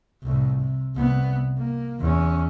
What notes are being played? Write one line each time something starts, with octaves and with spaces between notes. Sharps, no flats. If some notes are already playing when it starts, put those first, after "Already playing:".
C2 A2
C3
C2 B3
A#3
E2 C#4